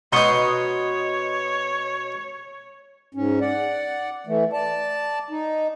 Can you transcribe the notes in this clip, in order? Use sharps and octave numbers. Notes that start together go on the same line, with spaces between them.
B2 D#4 C#5 C6 C#6 D#6
G#2 C#4
D5 F#5
E3 A3
D5 A5
D#4